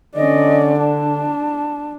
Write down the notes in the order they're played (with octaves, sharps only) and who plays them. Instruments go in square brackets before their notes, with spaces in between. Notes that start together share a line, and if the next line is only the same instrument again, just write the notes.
[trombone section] D3 [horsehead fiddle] C#4 D5 [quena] D#5
[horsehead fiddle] D4 [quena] A5